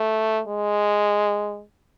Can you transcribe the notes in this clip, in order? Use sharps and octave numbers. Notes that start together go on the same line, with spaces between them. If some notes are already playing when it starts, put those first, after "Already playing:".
Already playing: A3
G#3